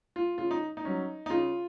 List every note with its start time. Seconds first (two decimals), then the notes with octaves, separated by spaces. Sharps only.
0.16 F4
0.38 C#3 F4
0.51 D#4
0.77 D#4
0.85 F#3 C#4
1.26 D#4
1.30 C#3 F4